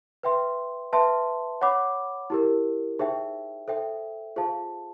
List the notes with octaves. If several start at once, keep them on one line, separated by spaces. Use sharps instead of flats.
B4 E5 G5 C6
B4 E5 A5 C6
C#5 F#5 B5 D6
E4 G4 A#4
D#4 G#4 C5 E5 G5
A4 C5 E5 G5
F4 G#4 C5 F5 A5